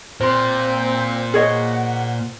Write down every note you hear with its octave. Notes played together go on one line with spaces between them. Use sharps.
A#2 C4 C5 C6
G#4 C#5 D#5 F#5